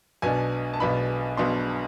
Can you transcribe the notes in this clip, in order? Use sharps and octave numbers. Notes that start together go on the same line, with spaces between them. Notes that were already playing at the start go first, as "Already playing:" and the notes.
B1 B2 B3 D4 G#5
A5
B1 B2 B3 D4 B5
B1 B2 B3 D4 C6